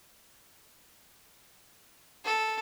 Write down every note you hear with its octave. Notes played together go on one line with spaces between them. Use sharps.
A4